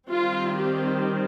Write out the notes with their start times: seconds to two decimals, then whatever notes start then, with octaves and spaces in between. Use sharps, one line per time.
0.11 D#3 G3 C4 F4
0.58 G4